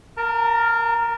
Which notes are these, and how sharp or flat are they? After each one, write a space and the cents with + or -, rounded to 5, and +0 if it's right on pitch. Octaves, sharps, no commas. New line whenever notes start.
A#4 +0 A5 +40